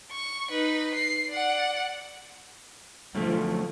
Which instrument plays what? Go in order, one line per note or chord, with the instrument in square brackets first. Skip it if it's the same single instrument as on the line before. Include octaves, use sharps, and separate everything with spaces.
[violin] C#6
D#4 B4
C7
D5 F#5
[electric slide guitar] F#2 D3 A3 [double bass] F3